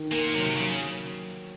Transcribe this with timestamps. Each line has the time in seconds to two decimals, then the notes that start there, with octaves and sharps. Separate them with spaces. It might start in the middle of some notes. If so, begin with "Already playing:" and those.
Already playing: D#3
0.12 A#2 A#3
0.35 C3 F#3
0.46 C3
0.57 C#3 F#3